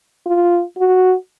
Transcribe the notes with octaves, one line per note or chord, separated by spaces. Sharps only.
F4
F#4